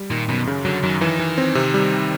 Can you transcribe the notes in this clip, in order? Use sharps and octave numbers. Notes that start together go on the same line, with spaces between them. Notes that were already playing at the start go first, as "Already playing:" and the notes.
Already playing: G3
A#2 D#3
F#2 B2
C#3
D3 F#3
F#2 D#3
D#3 E3
E3
C4
C3
G3